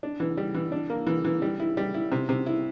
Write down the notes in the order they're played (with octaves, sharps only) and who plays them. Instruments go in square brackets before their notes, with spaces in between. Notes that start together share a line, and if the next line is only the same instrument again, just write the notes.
[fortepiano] D4
E3
G3
E3
D4
A#3
E3
E3
G3
E4
G3
E4
C3
C3
E4